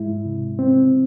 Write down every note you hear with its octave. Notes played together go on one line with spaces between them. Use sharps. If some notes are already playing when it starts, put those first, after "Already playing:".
Already playing: G#2 G#3 E4
C3
C4